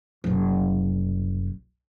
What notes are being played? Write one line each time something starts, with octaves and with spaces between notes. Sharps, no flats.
F#1 C2